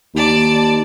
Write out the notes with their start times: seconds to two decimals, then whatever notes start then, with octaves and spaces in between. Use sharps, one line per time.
0.15 D#2 D5 A5